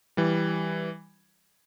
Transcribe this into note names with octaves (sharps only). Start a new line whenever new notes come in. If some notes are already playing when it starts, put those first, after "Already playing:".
E3 G3